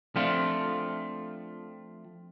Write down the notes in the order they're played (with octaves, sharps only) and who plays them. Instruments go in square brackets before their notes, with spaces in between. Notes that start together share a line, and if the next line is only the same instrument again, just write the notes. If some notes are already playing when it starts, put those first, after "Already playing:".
[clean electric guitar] F3 A3 C4 D4 F4